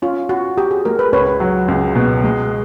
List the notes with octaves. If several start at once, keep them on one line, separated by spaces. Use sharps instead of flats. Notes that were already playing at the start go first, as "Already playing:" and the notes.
C#4 F4
C#4 F#4
F#4 G4
G#4
G#3 A#4
B4
C#2 B4 C#5
F#3
C#2
B2
G#3